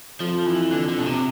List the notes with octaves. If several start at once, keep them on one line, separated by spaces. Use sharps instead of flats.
F2 F3
E3
D3
D3
B2
C3